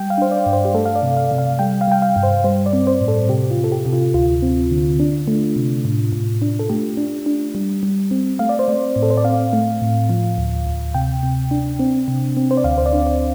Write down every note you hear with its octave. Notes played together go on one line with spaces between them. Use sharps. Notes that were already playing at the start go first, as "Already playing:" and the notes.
Already playing: G3 G5
F5
D4 C5
D5
G2
C5
G4
A3 A4
F5
D5
C3
F5
C3
F5
G3 G5
F5
G3 G5
F5
G2
C5
G3 C5
D5
C4
C5
A2
A4
C3 G4
F4
C3
A4
G4
C3
F4
D2 F4
C4
D3
D4
A3
C3
A2
A2
D4
A4
A3 G4
D4
D4
G3
G3
C4
A3 F5
D5
C5
A3 D5
A2
A4
C5
D5
C4 F5
A3
A2
F3
D2
D2
C3 G5
C3
D4
C4
C3
C4
C5
D5
D2 F5
C5
D5
D4
D5